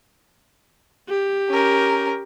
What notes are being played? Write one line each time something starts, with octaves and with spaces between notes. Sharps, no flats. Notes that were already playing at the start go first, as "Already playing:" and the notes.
G4
C#4 A#4